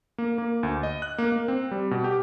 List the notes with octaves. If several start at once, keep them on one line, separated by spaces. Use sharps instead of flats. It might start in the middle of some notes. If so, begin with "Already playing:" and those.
A#3
A#3
D2
D#5
F#6
A#3
A#3
C4
G3
B2
G4